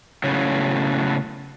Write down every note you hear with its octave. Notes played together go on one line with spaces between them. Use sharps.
A2 C#3 F#3